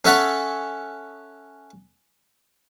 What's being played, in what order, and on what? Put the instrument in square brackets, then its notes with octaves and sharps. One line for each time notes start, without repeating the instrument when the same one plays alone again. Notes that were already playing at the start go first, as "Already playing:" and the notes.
[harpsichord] C#4 A4 C#5 E5 F#5 A5